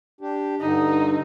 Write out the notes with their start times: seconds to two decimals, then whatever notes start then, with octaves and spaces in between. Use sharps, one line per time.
0.21 D4 G4
0.61 G2 D3 D#4